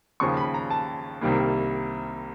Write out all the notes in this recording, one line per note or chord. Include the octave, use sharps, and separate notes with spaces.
D#2 C#3 F3 C#6
B5
A#5
A5
C2 C3 D#3 G3 A#3